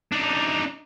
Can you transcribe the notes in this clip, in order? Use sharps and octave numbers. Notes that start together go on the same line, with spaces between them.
D4 D#4